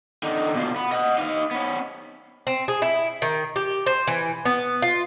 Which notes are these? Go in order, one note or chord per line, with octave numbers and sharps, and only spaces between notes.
D3 D#4
B2 F4
B3
D#5 F#5
D#4 F5
B3 C#4
C4
G#4
E4
D#3
G4
C5
E3
B3
F4